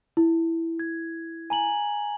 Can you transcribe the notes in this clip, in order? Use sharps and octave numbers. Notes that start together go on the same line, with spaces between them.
E4
G#6
G#5 A#5 F#7